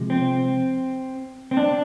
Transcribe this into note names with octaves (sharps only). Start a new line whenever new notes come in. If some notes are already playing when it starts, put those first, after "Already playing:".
Already playing: C3 F3 G#3
C4
C4
D4